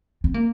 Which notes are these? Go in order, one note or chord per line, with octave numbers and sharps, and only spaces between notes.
C4
A#3